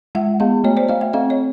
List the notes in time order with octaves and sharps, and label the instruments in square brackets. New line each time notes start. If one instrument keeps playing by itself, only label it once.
[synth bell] G#3 [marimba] E5 F#5
[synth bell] B3 [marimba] D#5 F5
[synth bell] A3 [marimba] C#5 D#5
[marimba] C5 D5
[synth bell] A3 [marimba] D#5 F5
[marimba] E5 F#5
[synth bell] C4 [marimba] D#5 F5
[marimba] C#5 D#5